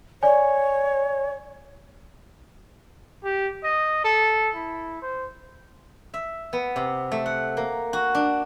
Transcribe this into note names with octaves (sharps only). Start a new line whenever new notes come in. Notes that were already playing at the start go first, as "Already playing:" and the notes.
C#5 D5 G#5
G4
D#5
A4
E4
C5
E5
B3
C3
A3
F#5
A#3
F#4
D4